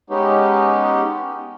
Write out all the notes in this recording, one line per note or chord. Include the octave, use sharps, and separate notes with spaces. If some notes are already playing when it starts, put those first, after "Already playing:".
G#3 B3 C#4 D#4 G4